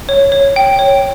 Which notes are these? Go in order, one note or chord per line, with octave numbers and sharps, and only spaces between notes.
C#5
C#5
G5
C#5